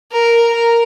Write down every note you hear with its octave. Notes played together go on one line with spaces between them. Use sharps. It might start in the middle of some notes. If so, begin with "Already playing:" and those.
A#4
A#4